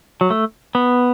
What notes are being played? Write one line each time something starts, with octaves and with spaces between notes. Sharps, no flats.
F#3
A3
B3